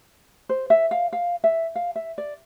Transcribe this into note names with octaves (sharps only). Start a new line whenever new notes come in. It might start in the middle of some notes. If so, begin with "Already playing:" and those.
C5
E5
F5
F5
E5
F5
E5
D5